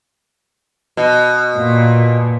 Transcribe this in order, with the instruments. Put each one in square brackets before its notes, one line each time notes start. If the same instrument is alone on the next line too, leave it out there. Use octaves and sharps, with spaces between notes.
[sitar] B2
[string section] A#2